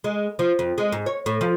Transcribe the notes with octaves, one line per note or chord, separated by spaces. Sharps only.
G#3
F3
F2
G#3
G#2
C#5
A2
F3